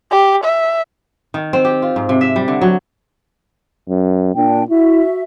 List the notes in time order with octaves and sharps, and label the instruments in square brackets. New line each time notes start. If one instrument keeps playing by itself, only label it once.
[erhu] G4
E5
[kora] D#3
C4
G4
F4
G#2
C3
E5
G3
D3
F#3
[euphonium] F#2
[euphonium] A#2 [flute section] D4 G5
[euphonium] E4 [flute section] F#4 E5